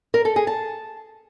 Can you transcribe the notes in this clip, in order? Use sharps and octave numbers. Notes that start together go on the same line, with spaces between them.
A#4
A4
G#4
A5